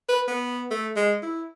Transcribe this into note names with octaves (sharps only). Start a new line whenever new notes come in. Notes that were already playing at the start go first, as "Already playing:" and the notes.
B4
B3
A3
G#3
E4